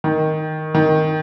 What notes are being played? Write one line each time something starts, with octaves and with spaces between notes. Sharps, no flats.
D#3
D#3